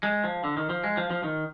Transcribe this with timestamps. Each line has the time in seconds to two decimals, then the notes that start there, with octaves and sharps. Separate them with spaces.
0.03 G#3
0.24 F3
0.44 D3
0.57 D#3
0.69 F3
0.84 G#3
0.97 F3
1.10 F3
1.23 D#3